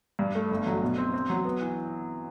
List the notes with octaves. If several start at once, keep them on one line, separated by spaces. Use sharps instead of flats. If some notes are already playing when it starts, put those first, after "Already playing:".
G2
A3
G1
F#3
B2
C4
C4
F#3
B3
E3